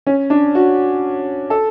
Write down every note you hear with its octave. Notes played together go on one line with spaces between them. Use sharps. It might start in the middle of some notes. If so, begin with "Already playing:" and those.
C#4
D4
F#4
A4